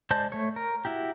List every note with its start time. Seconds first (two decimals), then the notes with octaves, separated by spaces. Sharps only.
0.11 G#3 C5 D5 A5 G6
0.32 A3 C#5
0.56 A#4
0.85 E4 F#4 G4